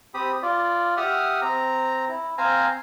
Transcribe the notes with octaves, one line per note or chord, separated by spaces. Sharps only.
C4 G4 B5 D#6
F4 D5
G4 E5 F#5 D#6 F6
C4 A#5
E4
C4 C5 F5 G#5 A#5